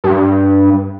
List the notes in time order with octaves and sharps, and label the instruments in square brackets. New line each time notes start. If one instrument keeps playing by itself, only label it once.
[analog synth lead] G2